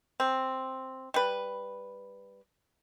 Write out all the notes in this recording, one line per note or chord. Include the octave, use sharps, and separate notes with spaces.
C4
G3 B4